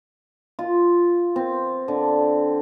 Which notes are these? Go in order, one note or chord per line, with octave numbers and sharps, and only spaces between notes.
F4
C4
D3